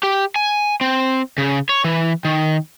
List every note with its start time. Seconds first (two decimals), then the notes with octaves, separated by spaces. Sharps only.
0.03 G4
0.36 G#5
0.81 C4
1.38 C#3
1.69 C#5
1.84 E3
2.25 D#3